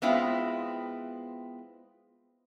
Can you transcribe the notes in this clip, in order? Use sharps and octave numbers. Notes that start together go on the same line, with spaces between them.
G#3 B3 C4 E4 F4